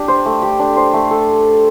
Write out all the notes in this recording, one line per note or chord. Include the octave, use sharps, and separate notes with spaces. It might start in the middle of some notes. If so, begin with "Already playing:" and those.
Already playing: D4 G4
C5
A3
G4
D4
C5
A3
A4